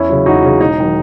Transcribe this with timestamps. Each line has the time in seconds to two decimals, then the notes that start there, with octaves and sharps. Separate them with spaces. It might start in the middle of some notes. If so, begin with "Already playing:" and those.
Already playing: E2 C#4 E4
0.09 C#3 F#3
0.25 E2 D#4 F#4
0.43 C#3 F#3
0.60 E1 D#4
0.80 D#3 F#3